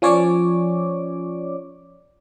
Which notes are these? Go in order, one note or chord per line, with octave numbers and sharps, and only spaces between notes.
F3 C#4 C#5 D5 D6